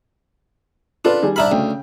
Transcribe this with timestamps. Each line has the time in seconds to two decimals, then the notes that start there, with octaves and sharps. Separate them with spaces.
1.05 D4 F4 A4 B4
1.22 D#3 G3 G#4
1.36 C2 D4 E4 A#5 B5 F6
1.52 D2 C#3 G5